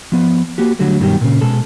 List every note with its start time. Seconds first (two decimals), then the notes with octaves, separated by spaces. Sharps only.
0.12 F3 B3
0.58 A#3 F#4 G4
0.79 D3 F#3 G3 A3
1.00 G2 B2 D#3 F#3 G3 G4
1.21 A#2 C#3
1.41 B2 G#3 G#4 A4